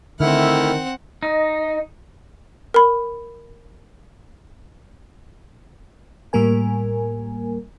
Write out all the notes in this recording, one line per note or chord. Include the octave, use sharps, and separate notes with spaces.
D3 D#3 A3 C4 E4 F#5 F6
D#4 D#5
A#4 B5
A2 G3 A#3 A#4 G#5